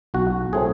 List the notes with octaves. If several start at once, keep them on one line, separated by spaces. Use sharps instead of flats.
B1 F#4
A2 F#3 A3 C4 G#4